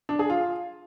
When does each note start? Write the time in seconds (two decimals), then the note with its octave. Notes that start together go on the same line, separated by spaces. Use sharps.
0.09 D4
0.19 G#4
0.30 F4